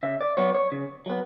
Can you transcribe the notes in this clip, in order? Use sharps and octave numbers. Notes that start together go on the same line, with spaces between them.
C#3 E5
D5
F#3 B3 C#5
C#5
C#3
F#3 B3